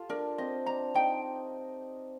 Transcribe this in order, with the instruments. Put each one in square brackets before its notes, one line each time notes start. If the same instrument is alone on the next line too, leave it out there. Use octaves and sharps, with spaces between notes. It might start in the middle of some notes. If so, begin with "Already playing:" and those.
Already playing: [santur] F4 G4 A4
[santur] D4 [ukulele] A#4
[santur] C4 [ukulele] D#5
[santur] D4 [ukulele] A#5
[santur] D#4 [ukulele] G5